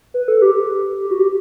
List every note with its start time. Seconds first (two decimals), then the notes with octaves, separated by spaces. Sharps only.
0.14 B4
0.28 A4
0.42 G4
1.11 F#4
1.19 G4